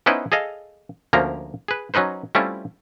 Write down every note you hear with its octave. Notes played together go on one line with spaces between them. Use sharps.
B3 C#4 D#4 E4 B4 C5
G#4 A4 D#5 F5
D2 F3 A#3 C#4 A#5
G#4 B4
F#3 C#4 D#4 B4 C5
G3 A3 C4 C#4 E4 F4